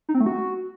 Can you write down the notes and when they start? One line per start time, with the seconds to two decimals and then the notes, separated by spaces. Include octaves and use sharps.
0.09 D#4
0.15 C4
0.20 A3
0.26 F#4